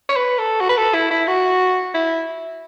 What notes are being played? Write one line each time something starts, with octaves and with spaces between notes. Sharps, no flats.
C#5
B4
A4
F#4
B4
A4
E4
E4
F#4
E4